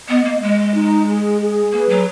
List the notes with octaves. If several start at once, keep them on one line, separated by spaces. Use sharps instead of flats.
B3 D#5
A#3
G#3 D#5
D#4
G#4
G#4
A#3 B4
F#3